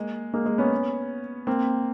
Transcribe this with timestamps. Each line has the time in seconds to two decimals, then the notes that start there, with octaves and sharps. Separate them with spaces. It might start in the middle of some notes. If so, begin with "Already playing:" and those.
Already playing: G#3 A#3
0.34 G#3 A#3
0.46 G#3
0.58 B3 C#4
1.47 A#3 C4